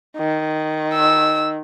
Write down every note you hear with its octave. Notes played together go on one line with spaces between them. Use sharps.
D#3
E6